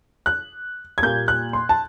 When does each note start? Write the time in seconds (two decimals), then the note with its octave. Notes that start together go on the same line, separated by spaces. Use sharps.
0.26 F#6
0.98 G#6
1.03 A#2 G3 A#3 G6
1.28 F#6
1.53 C6
1.69 A5